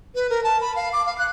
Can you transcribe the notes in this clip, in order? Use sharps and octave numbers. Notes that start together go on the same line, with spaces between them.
B4
A#4
A5
B5
F5
D6
F5
F#6